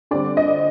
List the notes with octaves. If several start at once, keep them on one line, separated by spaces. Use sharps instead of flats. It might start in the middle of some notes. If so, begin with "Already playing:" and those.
D3 G3 C4 D5
D#5